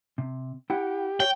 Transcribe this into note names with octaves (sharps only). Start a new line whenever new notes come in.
C3
E4 G4 F#5 G5
C#5 G5